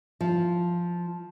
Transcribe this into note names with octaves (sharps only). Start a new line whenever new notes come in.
F3